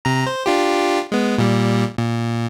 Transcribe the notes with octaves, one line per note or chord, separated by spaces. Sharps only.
C3 A#5
C5
D4 F4 G4
G#3 B3
A#2 G3
A#2